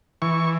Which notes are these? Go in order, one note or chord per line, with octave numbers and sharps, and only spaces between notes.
E3 C#6